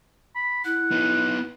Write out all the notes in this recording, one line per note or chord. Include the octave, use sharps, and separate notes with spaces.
B5
E4 F#5
B3 D#4